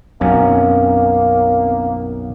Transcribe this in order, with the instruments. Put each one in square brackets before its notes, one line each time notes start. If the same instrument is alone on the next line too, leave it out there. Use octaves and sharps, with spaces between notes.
[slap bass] B1 [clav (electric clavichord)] F#2 C#4 [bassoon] A#3 [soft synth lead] C4